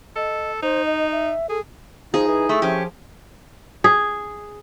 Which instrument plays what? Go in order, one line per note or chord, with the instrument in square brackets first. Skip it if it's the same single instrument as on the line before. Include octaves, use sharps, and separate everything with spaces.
[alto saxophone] A4 [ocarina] D#5
[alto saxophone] D#4 [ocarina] C5
[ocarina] D#5
E5
[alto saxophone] G#4 [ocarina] A4
[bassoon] F3 [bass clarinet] D#4 [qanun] G#4
[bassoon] E3
[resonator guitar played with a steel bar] A3 [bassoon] E4
[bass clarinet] F3 [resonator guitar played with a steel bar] C#4 G4
[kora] G#4